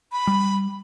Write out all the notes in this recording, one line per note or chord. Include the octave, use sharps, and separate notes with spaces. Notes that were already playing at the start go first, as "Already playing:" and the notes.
B5
G3